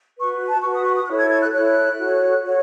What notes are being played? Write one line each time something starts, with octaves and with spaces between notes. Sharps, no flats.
F#4 B4 C#6
A5
F#4 B4 C#6
D#6
C#6
D#6
E4 A4 C#5 F#6
G#6
G#6
F#6
E4 A4 C#5 F#6
F#4 A4 C#5
F#4 A4 C#5